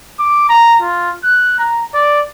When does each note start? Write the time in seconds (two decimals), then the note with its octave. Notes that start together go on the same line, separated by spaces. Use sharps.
0.19 D6
0.49 A#5
0.81 F4
1.24 F#6
1.59 A#5
1.94 D5